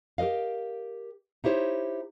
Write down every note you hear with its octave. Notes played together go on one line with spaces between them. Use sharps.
G4 A#4 B4 D#5 F5
D#4 E4 G4 C5 C#5